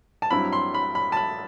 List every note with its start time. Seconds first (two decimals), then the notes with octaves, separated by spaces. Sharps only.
0.22 A5
0.31 G2 F#3 C4 E4 B5
0.53 C6
0.74 B5
0.95 B5
1.12 A5
1.17 B5